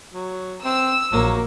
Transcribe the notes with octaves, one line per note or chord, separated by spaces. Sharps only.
F#3
C4 E6
A#1 F#3 A#3